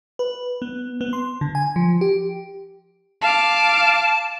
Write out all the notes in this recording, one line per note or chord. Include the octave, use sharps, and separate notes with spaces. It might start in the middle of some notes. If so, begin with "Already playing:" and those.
B4
B3
B3
C6
D3
G#5
F3
G4
F5 A5 D6